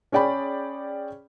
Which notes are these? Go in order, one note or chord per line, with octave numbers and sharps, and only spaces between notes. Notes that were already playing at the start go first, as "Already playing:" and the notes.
C#4 G#4 D5 G5 B5